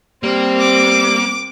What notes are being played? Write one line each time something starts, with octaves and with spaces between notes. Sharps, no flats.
G3 A#3 C4
D6